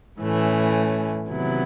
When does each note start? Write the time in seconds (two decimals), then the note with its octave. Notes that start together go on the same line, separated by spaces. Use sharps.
0.21 A2 E3 A3 C#4
1.28 C3 D#3 F#3 B3 E4